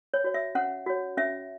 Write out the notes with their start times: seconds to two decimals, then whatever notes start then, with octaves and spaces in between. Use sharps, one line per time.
0.14 C#5
0.24 F#4 C#5
0.34 E5
0.55 C#4 F#5
0.86 F#4 C#5
1.17 C#4 E5